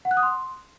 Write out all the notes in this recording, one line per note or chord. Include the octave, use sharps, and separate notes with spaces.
F#5
F#6
D#6
C6